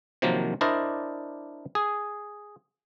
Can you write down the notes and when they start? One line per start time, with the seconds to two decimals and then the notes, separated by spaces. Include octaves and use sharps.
0.22 C3 D#3 F3 F#3 A#3
0.61 D4 E4 A#4 C5 D5 D#5
1.75 G#4